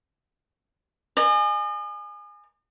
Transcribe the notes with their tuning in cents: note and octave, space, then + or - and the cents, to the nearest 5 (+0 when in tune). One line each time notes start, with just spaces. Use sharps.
D#5 -45 G#5 +0